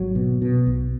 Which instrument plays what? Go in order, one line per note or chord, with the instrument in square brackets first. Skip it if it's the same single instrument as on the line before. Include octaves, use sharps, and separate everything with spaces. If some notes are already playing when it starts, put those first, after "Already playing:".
Already playing: [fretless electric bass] G#1 F#3
B2
B2
B1